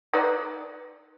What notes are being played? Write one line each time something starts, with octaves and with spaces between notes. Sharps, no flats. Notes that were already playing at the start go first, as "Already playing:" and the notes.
D#4 B4 D5